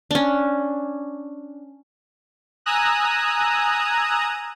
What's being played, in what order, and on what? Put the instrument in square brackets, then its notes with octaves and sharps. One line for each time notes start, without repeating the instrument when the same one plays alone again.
[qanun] C#4 D4
[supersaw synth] G#5 A#5 D#6 E6 F#6